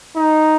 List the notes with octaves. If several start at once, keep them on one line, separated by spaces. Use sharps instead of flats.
D#4